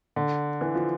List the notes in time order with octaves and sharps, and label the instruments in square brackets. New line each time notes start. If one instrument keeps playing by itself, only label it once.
[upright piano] D3
E3
F3